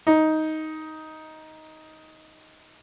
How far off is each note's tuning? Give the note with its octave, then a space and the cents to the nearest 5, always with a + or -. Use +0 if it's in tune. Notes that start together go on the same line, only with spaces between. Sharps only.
D#4 +10